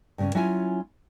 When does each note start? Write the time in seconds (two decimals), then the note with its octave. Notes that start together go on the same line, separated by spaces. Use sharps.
0.18 G2 C#3 C#4
0.35 F#3 C#4 E4 F4 G#5